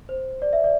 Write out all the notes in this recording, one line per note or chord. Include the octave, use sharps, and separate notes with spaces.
C5
D5
E5
D5